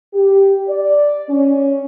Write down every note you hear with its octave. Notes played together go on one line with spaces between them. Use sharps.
G4
D5
C#4